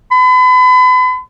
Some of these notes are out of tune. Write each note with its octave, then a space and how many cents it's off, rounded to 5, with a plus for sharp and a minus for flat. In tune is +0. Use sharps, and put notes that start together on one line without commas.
B5 +40